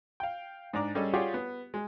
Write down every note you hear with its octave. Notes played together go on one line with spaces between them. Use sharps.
F5 G5
G#2 D4 D5 A#5 D6
G3 C#4 G#4 A4 D#5
F4 G4 G#4 C#5 D5 F#5
B3
G#3